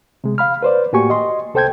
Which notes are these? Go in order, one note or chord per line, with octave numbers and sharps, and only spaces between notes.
C3 G#3
F5 B5 F6
B4 C5 D5
A2 A#3 F#4 G4 G#5 C#6
D#5 C6
C2 A4 C5 G5 G6 G#6